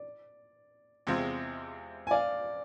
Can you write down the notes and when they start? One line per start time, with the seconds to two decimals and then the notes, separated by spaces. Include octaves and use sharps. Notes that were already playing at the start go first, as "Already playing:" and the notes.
Already playing: D5
1.07 E2 C3 G#3 C4 F4
2.07 G#5
2.11 D5 F5